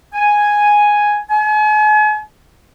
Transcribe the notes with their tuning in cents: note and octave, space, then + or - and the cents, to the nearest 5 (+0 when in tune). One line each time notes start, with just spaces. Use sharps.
G#5 +0
G#5 +40